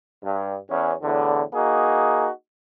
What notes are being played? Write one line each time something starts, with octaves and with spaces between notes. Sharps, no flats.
G2
E2 C#4
E2 A2 D3
A#3 D#4 F#4 G#4